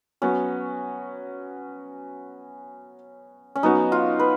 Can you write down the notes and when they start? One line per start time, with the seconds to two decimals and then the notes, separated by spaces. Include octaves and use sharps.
0.22 F#3 B3 C#4 F#4
3.56 C#4
3.63 F#3 B3 D#4 F#4
3.92 F4
4.20 B4